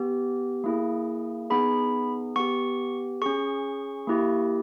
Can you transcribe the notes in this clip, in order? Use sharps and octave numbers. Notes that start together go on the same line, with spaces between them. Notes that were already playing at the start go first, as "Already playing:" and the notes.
Already playing: B3 G4
A#3 E4 G#4
B3 D#4 G#4 B5
B3 G4 C#6
C#4 G#4 C#6
A#3 E4 G4